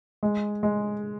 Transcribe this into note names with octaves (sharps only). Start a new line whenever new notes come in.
G#3
G#3